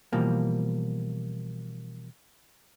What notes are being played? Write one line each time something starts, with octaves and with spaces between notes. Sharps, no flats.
B2 E3 F3 G3 A#3